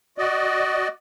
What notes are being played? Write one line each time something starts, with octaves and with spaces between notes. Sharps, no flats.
F#4 D5 D#5